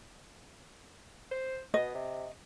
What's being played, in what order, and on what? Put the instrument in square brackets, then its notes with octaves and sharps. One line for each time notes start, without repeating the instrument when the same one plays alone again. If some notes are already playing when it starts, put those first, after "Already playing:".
[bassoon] C5
[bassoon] B2 [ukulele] D#5
[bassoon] C3